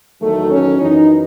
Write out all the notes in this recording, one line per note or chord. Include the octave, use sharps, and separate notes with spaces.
E2 D#3 F#3 A3
C#4
F#2 E3 D#4